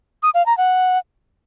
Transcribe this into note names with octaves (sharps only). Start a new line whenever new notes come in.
D#6
F5
A#5
F#5